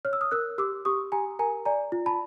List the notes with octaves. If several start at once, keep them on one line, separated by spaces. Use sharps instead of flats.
C#5 F6
E6
D#6 F6
A#4 E6 F#6
G4 D6 E6
G4 C#6 D#6
G4 G#5 A#5
A#4 G#5 A#5
D5 G#5 A#5
F4
A5 B5